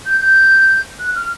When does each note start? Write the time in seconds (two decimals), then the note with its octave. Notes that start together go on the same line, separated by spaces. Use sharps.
0.06 G6
0.21 G6
0.99 F#6
1.15 F6